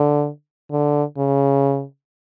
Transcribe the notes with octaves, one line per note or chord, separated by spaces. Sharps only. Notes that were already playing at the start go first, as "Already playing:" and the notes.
Already playing: D3
D3
C#3